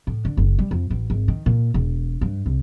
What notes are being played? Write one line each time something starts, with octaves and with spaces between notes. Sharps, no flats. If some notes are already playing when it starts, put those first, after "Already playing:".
A2
D3
F#1
G3
F2
A1
G#1
D#3
A#2
E1
G2
C2